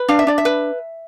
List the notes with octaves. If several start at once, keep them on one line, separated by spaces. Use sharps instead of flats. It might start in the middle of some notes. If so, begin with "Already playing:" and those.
Already playing: B4
D4 F5
E5
D4 D5
E5
B4